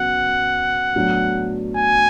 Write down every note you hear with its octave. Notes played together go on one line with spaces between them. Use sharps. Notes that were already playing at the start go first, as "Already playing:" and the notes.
Already playing: C#3 F#3 B3 F#4 F#5
A2 F#3 B3 D4
G#5